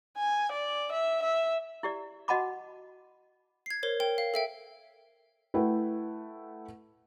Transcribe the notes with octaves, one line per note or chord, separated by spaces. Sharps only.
G#5
D5
E5
E5
E4 G4 D5
F#4 D#5 F#5 A5 B5 D6
G#6 C7
A#4 C5 C#5
A#4 G5
F5
A4 E5 G5
A3 E4 B4 F#5 G5